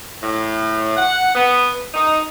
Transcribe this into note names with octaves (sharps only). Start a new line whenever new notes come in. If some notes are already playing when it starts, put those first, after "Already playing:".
A2
F#5
B3
D#4